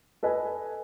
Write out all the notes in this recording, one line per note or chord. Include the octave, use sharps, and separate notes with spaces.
A4 B4 D#5 G#5